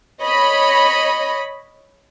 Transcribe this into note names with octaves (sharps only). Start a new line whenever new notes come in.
C#5 D#5 B5